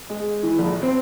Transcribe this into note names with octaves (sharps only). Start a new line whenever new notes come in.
G#3
E3
A#1
C4